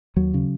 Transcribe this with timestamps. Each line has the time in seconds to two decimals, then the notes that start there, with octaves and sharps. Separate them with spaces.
0.16 D#2 F#3
0.34 C#3